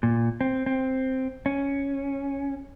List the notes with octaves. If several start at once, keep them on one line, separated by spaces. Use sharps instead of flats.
A#2
C4
C4
C#4